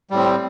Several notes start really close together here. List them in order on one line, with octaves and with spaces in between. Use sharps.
G3 A2 C4